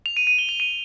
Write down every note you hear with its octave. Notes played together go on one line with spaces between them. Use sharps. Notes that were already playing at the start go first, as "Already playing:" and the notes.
F7
D#7
D#7
G7
F7
D#7